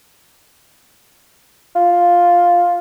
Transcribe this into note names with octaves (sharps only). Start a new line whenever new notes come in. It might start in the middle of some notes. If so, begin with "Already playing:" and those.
F4